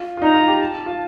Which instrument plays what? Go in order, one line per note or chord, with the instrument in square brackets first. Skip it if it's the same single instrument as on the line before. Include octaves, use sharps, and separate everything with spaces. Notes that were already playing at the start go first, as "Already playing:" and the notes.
Already playing: [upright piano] F4
F4
[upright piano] D#4 [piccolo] A#5
[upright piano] F4
G4
[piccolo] A5
[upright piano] F4